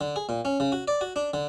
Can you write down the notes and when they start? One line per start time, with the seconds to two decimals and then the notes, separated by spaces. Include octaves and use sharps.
0.01 D3
0.16 G#4
0.29 A#2
0.45 C#4
0.60 C#3
0.72 F#4
0.88 D5
1.01 F#4
1.16 D4
1.34 D3